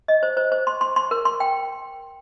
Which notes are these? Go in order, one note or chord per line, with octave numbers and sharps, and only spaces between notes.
D#5
C5
C5
C5
C6
C6
C6
A#4
C6
G5